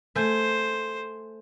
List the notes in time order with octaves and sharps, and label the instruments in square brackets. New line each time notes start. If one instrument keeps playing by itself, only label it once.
[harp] A3 G#5 G6 [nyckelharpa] C5